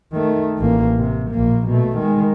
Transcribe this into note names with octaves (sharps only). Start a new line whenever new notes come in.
D#3 A3
A1 A#3
C3
A#1 A#3
B2 A3
D#3 G#3